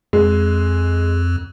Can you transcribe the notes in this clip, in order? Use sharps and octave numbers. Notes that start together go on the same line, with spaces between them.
F2 G#3